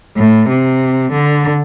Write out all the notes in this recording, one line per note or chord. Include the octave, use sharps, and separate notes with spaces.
A2
C3
D3